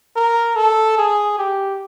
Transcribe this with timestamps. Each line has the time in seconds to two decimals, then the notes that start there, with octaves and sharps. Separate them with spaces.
0.16 A#4
0.56 A4
0.98 G#4
1.38 G4